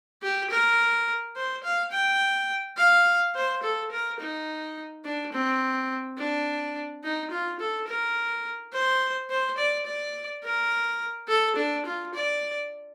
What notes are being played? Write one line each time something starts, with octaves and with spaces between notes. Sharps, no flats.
G4
A#4
C5
F5
G5
F5
C5
A4
A#4
D#4
D4
C4
D4
D#4
F4
A4
A#4
C5
C5
D5
D5
A#4
A4
D4
F4
D5